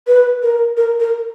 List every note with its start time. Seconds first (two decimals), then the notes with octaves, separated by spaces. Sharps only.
0.07 B4
0.43 A#4
0.77 A#4
1.00 A#4